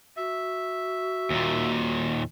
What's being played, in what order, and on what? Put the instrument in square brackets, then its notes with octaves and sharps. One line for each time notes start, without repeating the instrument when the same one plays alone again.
[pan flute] F#4 [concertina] E5
[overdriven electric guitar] D#2 A#2